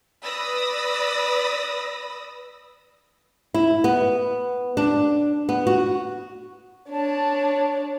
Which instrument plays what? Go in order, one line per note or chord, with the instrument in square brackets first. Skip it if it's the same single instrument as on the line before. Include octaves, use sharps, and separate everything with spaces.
[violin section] B4 D5 B5 D#6 E6 A#6
[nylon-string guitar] E4
B3
D4
B3
F#4
[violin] D4 C#5 [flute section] A5